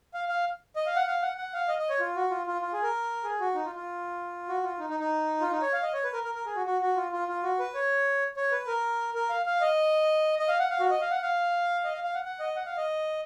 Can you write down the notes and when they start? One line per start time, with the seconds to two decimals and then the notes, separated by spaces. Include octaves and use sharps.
0.14 F5
0.29 F5
0.76 D#5
0.86 F5
0.96 F#5
1.07 F5
1.22 F#5
1.37 F#5
1.53 F5
1.68 D#5
1.79 D#5
1.89 C#5
2.00 F4
2.16 F#4
2.30 F4
2.47 F4
2.62 F4
2.73 G#4
2.83 A#4
3.24 G#4
3.40 F#4
3.54 D#4
3.65 F4
3.75 F4
4.48 F#4
4.63 F4
4.79 D#4
4.90 D#4
5.00 D#4
5.41 F4
5.51 D#4
5.62 C#5
5.73 F5
5.82 D#5
5.93 C#5
6.04 B4
6.13 A#4
6.24 A#4
6.35 A#4
6.46 G#4
6.56 F#4
6.66 F#4
6.82 F#4
6.96 F4
7.12 F4
7.28 F4
7.43 F#4
7.59 B4
7.75 C#5
8.37 C#5
8.52 B4
8.67 A#4
9.14 A#4
9.30 F5
9.46 F5
9.61 D#5
10.39 D#5
10.48 F5
10.59 F#5
10.70 F5
10.80 F#4
10.90 D#5
11.01 F5
11.11 F#5
11.22 F5
11.84 D#5
11.93 F5
12.04 F5
12.14 F#5
12.24 F#5
12.40 D#5
12.56 F#5
12.66 F5
12.77 D#5